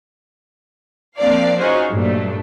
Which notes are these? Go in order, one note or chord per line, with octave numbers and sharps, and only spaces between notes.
F3 A#3 C4 D4 D5 F5
C#4 D#4 F4 F#4 G#4 C5
G2 A#2 F#3 A3 D4